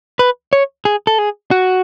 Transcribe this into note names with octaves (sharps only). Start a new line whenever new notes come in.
B4
C#5
G#4
A4
G#4
F#4